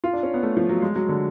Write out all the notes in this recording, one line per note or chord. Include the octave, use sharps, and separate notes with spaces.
F4
D4
C#4
B3
A3
F3
F#3
G#3
F#3
D3